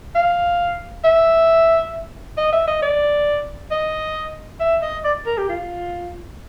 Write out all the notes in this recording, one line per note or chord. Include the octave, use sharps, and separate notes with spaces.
F5
E5
D#5
E5
D#5
D5
D#5
E5
D#5
D5
A#4
G4
F4